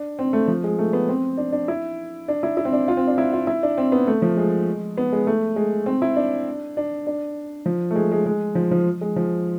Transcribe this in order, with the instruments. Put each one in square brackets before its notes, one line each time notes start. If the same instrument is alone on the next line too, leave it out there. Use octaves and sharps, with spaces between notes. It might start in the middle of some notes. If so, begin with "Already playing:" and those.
Already playing: [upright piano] D4
C4
A3
F3
G#3
A3
B3
C4
D4
D4
E4
D4
E4
E4
C4
D4
F4
C4
D4
E4
F4
E4
D4
C4
B3
A3
F3
G#3
B3
G#3
A3
G#3
C4
E4
D4
D4
D4
F3
A3
G#3
G#3
G#3
F3
F3
G#3
F3